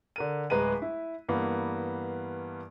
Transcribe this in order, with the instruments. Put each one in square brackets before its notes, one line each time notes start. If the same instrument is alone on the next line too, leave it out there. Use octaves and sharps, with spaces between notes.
[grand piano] D3 A#4 D#7
D1 G#3 B4 A#5 D#7
E4
G2 E3 A#3 B3